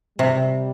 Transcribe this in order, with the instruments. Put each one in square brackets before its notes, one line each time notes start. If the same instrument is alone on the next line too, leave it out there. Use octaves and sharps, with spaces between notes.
[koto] C3 [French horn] G3